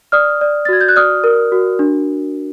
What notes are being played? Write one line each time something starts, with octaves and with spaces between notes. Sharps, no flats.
D5 D#6 F6
D5
A6
F#4 G#6
G6
F#6
D5 D#6 F6
A#4
F#4
D4